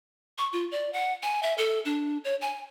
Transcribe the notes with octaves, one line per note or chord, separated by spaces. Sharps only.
C#6
F4
D5
F#5
G#5
E5
A4
D4
C#5
G#5